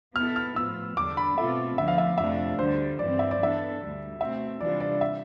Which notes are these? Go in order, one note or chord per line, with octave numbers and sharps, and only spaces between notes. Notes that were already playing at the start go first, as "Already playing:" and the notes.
B2 B3 E4 A4 F6
F6
A2 F3 B3 F4 E6
E2 D3 G3 D4 D6
B5
B2 A3 C4 F4 A4 E5
D2 D3 F3 B3 E5
F5
E5
F2 C3 F3 A3 D4 E5
D2 D3 G3 C5
G2 E3 G3 C4 D5
E5
D5
E3 B3 D4 A4 E5
D2 D3 G3
B2 A3 C4 E5
C3 E3 G3 D4 F4 D5
D5
E5